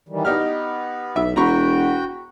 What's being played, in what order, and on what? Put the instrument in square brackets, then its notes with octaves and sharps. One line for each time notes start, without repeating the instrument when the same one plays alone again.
[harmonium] D#3 E3 G3
[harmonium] B3 [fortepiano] D#4 G4 F6
[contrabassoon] B1 [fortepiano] E5
[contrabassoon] E1 [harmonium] F#4 G5 [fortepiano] A#5 B5 C#6